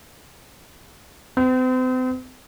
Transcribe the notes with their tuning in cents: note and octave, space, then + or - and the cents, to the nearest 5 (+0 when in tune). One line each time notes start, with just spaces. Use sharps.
C4 -40